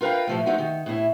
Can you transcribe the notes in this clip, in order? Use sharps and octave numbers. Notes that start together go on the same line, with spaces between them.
F4 A#4 B4 F5 G5
A2 F3 A3
G#3 A3 D#4 F#4
D#3
A2 E4